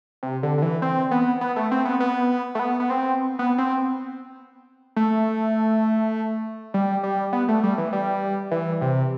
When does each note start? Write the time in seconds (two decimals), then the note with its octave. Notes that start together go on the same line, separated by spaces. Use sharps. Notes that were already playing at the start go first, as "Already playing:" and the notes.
0.23 C3
0.43 D3
0.58 D3
0.62 E3
0.82 C4
1.11 B3
1.41 B3
1.56 A3
1.71 C4
1.85 B3
2.00 B3
2.55 A3
2.59 B3
2.80 B3
2.90 C4
3.39 B3
3.58 C4
4.96 A3
6.74 G3
7.03 G3
7.33 B3
7.49 A3
7.63 G3
7.78 E3
7.93 G3
8.51 E3
8.81 C3